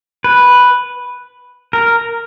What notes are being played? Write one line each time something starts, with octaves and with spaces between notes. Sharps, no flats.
B4
A#4